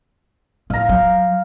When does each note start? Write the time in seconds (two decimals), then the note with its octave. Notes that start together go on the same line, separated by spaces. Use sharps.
0.70 A2 F5 A#5
0.89 F#3